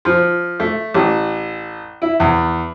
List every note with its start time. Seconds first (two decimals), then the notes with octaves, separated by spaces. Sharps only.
0.05 F3
0.60 A3
0.94 A1
2.02 E4
2.20 E2